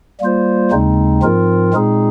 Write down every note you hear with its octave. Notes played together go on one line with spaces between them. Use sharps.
G3 A#3 F4 C5
D#2 C#3 G#3 C4 D#4
G#2 F3 C4 F4 A#4
A#2 G#3 C4 D#4 G#4